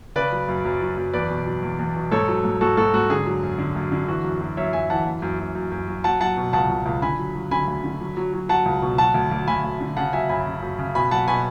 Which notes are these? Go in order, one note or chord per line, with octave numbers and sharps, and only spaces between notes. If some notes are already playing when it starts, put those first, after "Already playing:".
C#3 B4 D5
F#3
F#2
F#2
F#3
F#2
E2 B4 D5
B2
F#3
E2
E2
B2
G#2 A4 C#5
F#3
G#2
G#2 F#4 A4
G#2 F#4 A4
G#2 F#4
D3 G#4
F#3
F#2
D3
F#2
D3
E3 F#4
F#2
F#2
F#2 C#5 E5
F#2 E5 G#5
E3 F#5 A5
F#2
F#2
F#2
F#2
F#2
F#3
F#3 F#5 A5
F#3 F#5 A5
B2
C#2 F#5 A5
C#2
C#2
D3 G#5 B5
F#3
F#3
D3 G#5 B5
D2
D3
F#3
F#3
F#3
F#3 F#5 A5
C#2
B2
F#3 F#5 A5
D2
D2
D2 G#5 B5
D2
D3
C#3 F#5 A5
F#3 E5 G#5
F#2 G#5 B5
C#3
F#2
C#3
B2 G#5 B5
F#3 F#5 A5
B2 G#5 B5